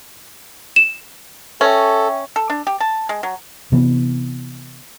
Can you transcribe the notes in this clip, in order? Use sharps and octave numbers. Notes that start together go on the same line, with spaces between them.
E7
C#4 A4 E5 G5
A4
D4
G4
A5
G#3
F#3
C3 E3 B3